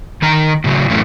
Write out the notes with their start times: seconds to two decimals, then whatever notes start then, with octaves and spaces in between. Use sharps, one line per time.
0.22 D#3 D#4 A#5
0.64 A2 C#3 F#3
0.89 F#2 A2 E3 A3 C#4